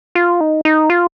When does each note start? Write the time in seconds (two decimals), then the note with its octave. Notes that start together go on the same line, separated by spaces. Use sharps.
0.15 F4
0.41 D#4
0.65 D#4
0.90 F4